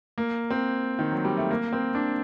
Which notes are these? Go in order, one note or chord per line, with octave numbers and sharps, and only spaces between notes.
A#3
C4
D#3
F#3
G3
A3
A#3
C4
D4